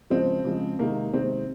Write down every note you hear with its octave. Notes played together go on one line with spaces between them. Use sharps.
C#3 F3 G#3 C4
C#3 F3 G#3
C3 D#3 G#3 A#3
C3 D#3 G#3 C4